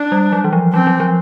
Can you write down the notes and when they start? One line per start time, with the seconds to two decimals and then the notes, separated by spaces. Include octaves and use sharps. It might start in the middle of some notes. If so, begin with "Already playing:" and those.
Already playing: D4
0.12 G3
0.32 F#3
0.44 E3
0.53 F3
0.73 F#3 C4
0.87 F#3
1.00 F3